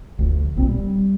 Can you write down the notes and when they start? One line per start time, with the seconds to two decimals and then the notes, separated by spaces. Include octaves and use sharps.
0.18 F1 D2
0.56 F1 B1 A#2 C4
0.69 G3